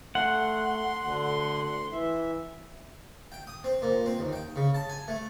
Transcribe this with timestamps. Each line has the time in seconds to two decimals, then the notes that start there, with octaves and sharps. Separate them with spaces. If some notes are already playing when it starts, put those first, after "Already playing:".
0.15 A3 F#5 C6
1.05 D2 D3
1.92 E3 E5
3.32 G5
3.47 D#6
3.64 C4
3.82 A#2
4.06 C4
4.19 D#2
4.33 G5
4.56 C#3
4.74 A5
4.90 G#5
5.08 A3